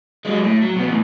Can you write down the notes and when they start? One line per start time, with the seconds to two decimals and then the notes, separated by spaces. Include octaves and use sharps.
0.25 F#3 G#3
0.44 A2
0.62 F#3
0.76 B2 B3
0.87 E2 A2